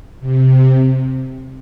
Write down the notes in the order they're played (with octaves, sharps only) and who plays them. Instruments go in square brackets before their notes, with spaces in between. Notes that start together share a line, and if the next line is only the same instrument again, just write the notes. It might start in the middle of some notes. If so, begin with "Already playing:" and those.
[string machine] C3